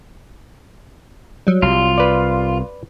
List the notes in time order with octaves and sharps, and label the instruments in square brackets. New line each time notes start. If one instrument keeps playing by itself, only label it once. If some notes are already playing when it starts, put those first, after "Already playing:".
[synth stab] F#3 G3
[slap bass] C2 [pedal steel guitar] F4
[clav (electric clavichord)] B4 D5